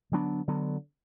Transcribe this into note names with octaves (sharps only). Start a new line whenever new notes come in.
D3 F#3 B3 D4
D3 F#3 B3